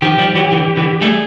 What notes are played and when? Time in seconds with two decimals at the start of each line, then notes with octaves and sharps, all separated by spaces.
0.02 D#3 F3 G4
0.18 F3 G3
0.35 E3 F#3
0.52 D3 E3
0.77 D3 E3
1.01 G3 A3 G#4